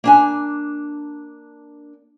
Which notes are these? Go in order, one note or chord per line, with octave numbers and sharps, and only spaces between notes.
A#3 D4 G#5